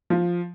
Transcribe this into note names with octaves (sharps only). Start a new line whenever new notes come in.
F3